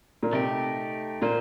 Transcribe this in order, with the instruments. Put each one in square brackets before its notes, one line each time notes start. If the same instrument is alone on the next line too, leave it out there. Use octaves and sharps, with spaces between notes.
[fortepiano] A#2
[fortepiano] C3 [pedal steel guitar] A3 D#4 G4
[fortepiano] A#2 [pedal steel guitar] A#3 F4 C5